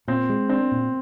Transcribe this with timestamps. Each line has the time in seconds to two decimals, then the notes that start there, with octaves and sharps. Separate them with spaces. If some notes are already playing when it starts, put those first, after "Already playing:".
0.08 A#2 C4
0.29 G#3
0.49 C4 D4
0.72 A#2